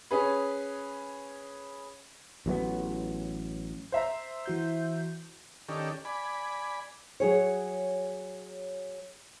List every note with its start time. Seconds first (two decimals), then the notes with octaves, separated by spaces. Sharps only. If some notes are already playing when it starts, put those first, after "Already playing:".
0.11 C#4 G#4 B4
2.46 A1 F#3 A3 B3
3.92 C5 E5 A#5
4.46 E3 F#4 G6
5.69 D#3 C#4 G4 A4 D5
6.05 D5 G#5 B5
7.20 F#3 G#4 C#5